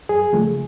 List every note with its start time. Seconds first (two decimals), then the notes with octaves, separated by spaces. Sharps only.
0.09 F#2 G#4
0.33 C#3 F3 A3